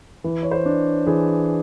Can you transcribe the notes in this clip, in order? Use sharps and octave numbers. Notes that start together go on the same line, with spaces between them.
E3
C#5
C5
D4
E3 G#4